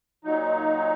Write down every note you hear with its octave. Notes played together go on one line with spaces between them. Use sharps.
A#2 F#3 D#4